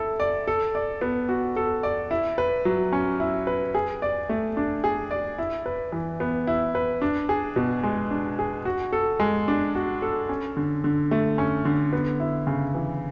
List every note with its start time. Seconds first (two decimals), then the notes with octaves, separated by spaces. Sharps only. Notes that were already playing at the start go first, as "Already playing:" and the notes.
Already playing: E4 A4
0.20 D5
0.47 A4
0.75 D5
1.01 B3
1.29 F#4
1.56 A4
1.83 D5
2.11 E4
2.38 B4
2.65 F#3
2.93 C#4
3.20 E4
3.47 B4
3.75 G#4
4.02 D5
4.29 A3
4.57 D4
4.84 G#4
5.11 D5
5.38 E4
5.66 B4
5.92 E3
6.20 B3
6.47 E4
6.75 B4
7.02 D4
7.29 G#4
7.56 B2
7.83 G#3
8.11 D4
8.39 G#4
8.65 F#4
8.93 A4
9.20 G#3
9.48 D4
9.75 F#4
10.02 A4
10.29 C#4
10.57 D3
10.84 D3
11.11 A3
11.38 C#4
11.65 D3
11.93 B3
12.20 E4
12.47 C#3
12.75 E3